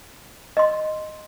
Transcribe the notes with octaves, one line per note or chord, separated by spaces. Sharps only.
D#5 C6